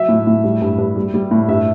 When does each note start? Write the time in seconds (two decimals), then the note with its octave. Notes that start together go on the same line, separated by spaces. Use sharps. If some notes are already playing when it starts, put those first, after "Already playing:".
Already playing: F#3 E5
0.09 A2
0.27 A2
0.44 G3
0.62 G2
0.78 G2
0.96 G3
1.14 G3
1.31 A2
1.49 G2 E5